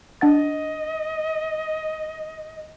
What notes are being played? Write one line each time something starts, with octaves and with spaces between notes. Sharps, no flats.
D4 D#5 F#5 A6